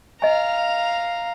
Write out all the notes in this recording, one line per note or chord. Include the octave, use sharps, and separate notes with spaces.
D#5 F5 G#5 A#5